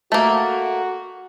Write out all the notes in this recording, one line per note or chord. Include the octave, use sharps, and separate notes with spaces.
A3 A#3 F#4